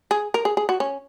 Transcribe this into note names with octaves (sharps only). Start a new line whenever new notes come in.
G#4
A#4
G#4
G#4
F#4
C#4